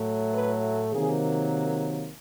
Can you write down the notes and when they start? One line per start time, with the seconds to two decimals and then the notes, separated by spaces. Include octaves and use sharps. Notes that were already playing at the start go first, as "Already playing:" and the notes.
Already playing: A2 F#3 A3
0.35 B4
0.92 C3 D#3 F#3 A#3 G#4